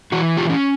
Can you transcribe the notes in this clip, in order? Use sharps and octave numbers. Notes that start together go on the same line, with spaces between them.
E3 F#4
F4 G4
C#4